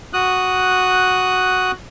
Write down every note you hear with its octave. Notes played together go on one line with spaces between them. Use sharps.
F#4 D#6 F#6